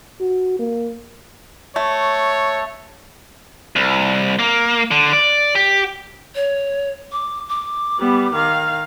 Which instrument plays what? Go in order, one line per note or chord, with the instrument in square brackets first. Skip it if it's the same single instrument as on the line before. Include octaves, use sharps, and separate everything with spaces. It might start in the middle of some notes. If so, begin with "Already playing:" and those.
[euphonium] F#4
A#3
[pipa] A3 [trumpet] C#5
[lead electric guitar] C2
A#3
D3
D5
G4
[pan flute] C#5
D6
D6
[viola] G3 B3
D#3 F5